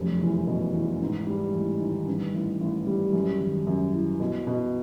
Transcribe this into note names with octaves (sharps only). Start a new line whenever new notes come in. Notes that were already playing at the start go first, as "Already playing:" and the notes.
Already playing: F1 F#2 G3
E2
B2
E2
G#2
G3
A1
D#3
G2
A1
A1
G3
F#2
G#1
F#2
E3
B2
B2